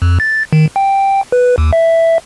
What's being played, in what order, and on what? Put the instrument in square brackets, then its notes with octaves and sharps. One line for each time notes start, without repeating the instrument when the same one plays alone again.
[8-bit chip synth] F2
A6
D#3
G5
B4
D#2
E5